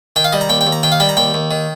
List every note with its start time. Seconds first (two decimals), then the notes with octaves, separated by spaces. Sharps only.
0.16 D#3 G5
0.24 F5
0.33 G3 D#5
0.41 A#5
0.49 D#2 G5
0.61 G5
0.67 D#2
0.72 A#5
0.83 D#3 G5
0.92 F5
1.00 G3 G5
1.09 A#5
1.17 D#2 G5
1.34 D#2
1.51 D#3